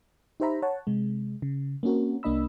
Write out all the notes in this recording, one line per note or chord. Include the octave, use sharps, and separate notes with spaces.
D#4 G4 C5 E5 A#5 B5
C#5 F#5 A5
C3 G#3
C#3
A#3 C4 C#4 F#4 A#4
C2 A#3 D4 D#5 B5 E6